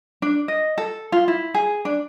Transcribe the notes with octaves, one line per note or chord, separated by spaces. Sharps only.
D4
D#5
A4
F4
E4
G#4
D4